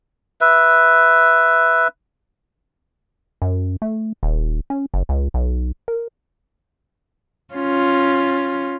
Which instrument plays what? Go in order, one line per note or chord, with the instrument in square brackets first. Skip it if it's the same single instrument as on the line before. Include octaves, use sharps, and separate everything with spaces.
[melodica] B4 E5
[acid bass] F#2
A3
D#1
C#4
F#1
C#2
B1
A#4
[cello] C#4 F4